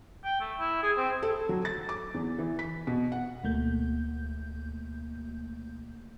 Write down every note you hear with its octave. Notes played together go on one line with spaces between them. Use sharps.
G5
A3
E4
G#4
C4
A4
F#3
A6
D6
E2
E3
B6
B2
F#5
D2 B2 A3 A#3 G6